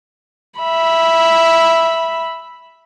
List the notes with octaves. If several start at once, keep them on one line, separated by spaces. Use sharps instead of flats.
E5 B5